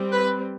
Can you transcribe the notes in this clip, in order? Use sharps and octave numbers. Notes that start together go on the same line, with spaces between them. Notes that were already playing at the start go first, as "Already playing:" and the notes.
Already playing: G3 C4
B4